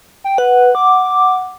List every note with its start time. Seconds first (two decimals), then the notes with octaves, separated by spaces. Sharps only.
0.24 G5
0.38 B4 F#5
0.75 D6